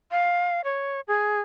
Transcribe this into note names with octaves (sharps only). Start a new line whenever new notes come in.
F5
C#5
G#4